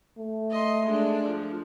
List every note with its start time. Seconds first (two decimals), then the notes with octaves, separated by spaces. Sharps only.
0.18 A3
0.51 D#5 C6
0.87 G#3 D4
1.27 F3